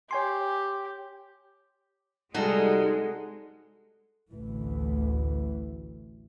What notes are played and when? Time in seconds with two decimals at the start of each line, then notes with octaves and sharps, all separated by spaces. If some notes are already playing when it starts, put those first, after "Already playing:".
0.11 G4 C#5 G#5 C6
2.34 C3 G3 G#3 D#4 F#4 A4 A#5
4.33 A1 D2 E3